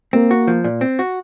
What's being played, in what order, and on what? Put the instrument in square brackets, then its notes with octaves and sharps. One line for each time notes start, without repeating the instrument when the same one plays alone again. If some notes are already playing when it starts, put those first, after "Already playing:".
[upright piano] A#3 [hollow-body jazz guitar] C4
[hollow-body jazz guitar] F#4
F3
A#2
C4
F#4